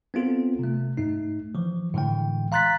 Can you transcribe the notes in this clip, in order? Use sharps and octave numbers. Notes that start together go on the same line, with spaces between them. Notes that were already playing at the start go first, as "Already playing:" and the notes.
B3 C4 F4 A4
C3 A3
G#2 A3 D#4
E3 F3
A2 D3 E3 G#3 G5
F5 A#5 C6 F#6 A6 B6